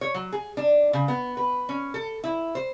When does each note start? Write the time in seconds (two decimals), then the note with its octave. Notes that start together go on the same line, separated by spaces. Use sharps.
0.01 C#5
0.14 F#3
0.32 G#4
0.57 D4
0.93 C#3
1.08 B3
1.37 B4
1.69 C#4
1.94 A4
2.24 E4
2.55 C5